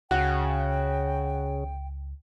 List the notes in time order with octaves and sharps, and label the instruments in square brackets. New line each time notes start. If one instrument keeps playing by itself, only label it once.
[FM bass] C#2 [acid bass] C#3 [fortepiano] F#4 [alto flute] G5